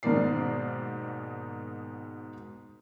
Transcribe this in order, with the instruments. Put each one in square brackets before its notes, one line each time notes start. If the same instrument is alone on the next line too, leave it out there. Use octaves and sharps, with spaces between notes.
[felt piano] G#2 B2 D#3 A#3 D5 C7